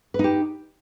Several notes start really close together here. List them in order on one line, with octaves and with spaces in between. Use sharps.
B4 D#4 G4